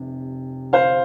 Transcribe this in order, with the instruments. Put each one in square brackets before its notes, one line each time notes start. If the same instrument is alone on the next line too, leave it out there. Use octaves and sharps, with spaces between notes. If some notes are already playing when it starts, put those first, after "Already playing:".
Already playing: [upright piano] F1 C3
C5 F5